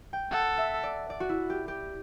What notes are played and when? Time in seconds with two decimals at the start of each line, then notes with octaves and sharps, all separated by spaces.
0.13 G5
0.31 A4 F#5
0.57 E5
0.83 D5
1.10 D5
1.20 F#4
1.29 E4
1.50 G4
1.68 G4